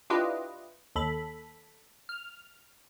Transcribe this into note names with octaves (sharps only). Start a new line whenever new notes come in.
D4 E4 F4 G4 B4 D#5
D#2 A4 B5
F6